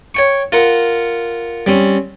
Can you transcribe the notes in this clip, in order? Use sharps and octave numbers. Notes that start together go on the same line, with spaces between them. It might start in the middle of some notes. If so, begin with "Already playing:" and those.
C#5 G5 C#6
F4 A#4 F#5
G3 C4 C#4